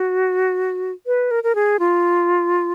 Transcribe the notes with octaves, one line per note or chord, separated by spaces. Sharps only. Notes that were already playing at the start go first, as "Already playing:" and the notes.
Already playing: F#4
B4
A#4
A#4
G#4
F4